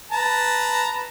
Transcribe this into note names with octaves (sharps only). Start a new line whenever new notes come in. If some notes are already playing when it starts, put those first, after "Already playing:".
B4 A5 A#5